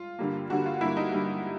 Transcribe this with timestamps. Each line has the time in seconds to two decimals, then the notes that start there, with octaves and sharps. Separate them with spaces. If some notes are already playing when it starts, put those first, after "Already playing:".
Already playing: F4
0.19 G2 D3 G3 A#3
0.50 G2 D3 G3 A#3 F#4
0.66 F4
0.81 G2 D3 G3 A#3 E4
0.97 D#4
1.12 G2 D3 G3 A#3